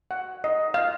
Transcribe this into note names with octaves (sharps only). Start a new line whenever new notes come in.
F#5
D#5
F5